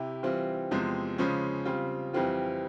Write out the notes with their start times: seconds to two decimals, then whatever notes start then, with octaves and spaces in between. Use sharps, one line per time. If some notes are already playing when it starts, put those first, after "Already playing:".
Already playing: C3 E4 G4
0.23 E3 G3 C4 F4
0.71 E2 C3 F3 G#3 C4
1.18 C#3 F3 G#3 C#4
1.65 C#3 G3 C4 F4
2.13 F2 E3 G3 C4 F4